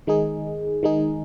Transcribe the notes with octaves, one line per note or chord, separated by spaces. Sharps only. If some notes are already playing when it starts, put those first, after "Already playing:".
D#3 G#3 D#4 G#4
D#3 G#3 D#4 G#4